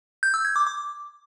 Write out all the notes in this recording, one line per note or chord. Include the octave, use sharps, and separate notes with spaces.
G6
E6
G#6
D6
D6